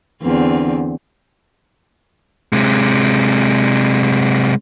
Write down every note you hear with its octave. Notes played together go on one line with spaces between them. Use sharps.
E2 D3 C4
C3 G#3